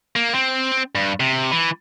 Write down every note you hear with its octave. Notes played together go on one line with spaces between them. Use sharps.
A#3
C4
G2
C3
E3